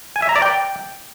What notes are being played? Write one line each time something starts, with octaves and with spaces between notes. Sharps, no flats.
G#5
E5
A#5
D5
G5